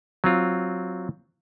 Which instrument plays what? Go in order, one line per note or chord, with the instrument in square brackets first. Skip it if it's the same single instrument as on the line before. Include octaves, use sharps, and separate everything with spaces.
[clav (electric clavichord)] F#3 C4 F4